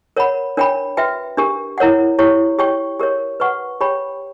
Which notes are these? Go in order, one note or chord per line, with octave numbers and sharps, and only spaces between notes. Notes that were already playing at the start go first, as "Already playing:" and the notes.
A#4 C#5 F#5 B5
D4 A#4 C#5 G5 B5
F#4 B4 E5 G5
D4 G4 A#4
E4 A#4 C#5 F#5
E4 G4 C#5
G4 C#5 G5 C#6
G4 A#4 C#5
B4 F#5 C#6
G4 C#5 G5 B5